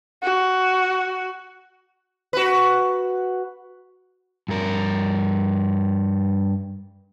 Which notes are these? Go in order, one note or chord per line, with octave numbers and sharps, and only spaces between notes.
F#4
F#4 B4
G2 A#4